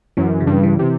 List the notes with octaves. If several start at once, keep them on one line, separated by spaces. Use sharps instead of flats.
F#2 E3
C#3
G2
E3
C3